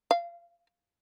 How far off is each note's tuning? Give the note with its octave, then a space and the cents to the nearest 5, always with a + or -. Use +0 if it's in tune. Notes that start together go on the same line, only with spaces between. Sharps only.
F5 -25